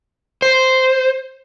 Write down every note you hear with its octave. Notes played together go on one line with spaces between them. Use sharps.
C5